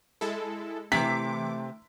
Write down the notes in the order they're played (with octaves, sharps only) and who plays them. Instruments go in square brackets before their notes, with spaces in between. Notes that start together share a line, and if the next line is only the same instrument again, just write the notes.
[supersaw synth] G#3 E4 A4
[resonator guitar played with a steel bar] C3 [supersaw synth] E3 D6 [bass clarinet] A3 [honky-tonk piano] B6